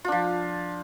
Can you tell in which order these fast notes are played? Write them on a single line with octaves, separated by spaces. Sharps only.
F4 D4 F3